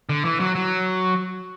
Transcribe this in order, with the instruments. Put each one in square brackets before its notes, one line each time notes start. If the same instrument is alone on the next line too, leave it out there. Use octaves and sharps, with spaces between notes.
[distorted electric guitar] D3
E3
F#3
F#3